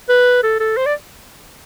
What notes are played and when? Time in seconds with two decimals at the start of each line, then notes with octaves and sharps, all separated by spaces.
0.09 B4
0.43 A4
0.60 A4
0.77 C5
0.86 D5